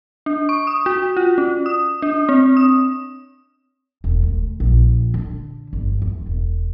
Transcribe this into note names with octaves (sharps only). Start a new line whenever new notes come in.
D4
C#6
D#6
F#4
F4
C#4
D#6
D4
C4
D#6
E1
D2
A#1
D3
G1
E2
E1